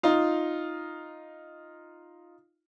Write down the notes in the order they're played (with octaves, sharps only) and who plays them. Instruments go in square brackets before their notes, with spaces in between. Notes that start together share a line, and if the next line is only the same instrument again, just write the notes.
[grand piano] D#4 F4